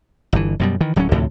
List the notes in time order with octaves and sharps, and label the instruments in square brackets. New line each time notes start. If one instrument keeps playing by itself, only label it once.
[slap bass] G1 E3
F#2 B2 G3
D#3 E3
D1 F#3 G3 C#4
D2 A2 C3 F3